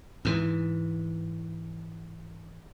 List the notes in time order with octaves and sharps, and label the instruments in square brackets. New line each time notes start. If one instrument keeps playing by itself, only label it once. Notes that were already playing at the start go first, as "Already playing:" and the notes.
[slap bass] G#2 E3